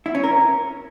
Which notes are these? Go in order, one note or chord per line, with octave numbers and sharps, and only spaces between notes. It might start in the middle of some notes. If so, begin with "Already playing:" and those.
E4
C#4
A#4